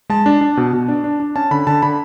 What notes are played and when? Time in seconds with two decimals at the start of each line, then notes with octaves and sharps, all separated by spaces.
0.10 G#3 A5
0.26 D4
0.41 D4
0.57 B2
0.73 B2
0.88 D4
1.04 D4
1.20 D4
1.36 C#4 A5
1.51 D3 B5
1.67 D3 A5
1.82 D3 B5